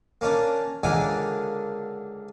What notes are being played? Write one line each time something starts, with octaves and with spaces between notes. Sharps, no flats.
A#3 C#4 D4
C#2 D3 A#3 D4 G#5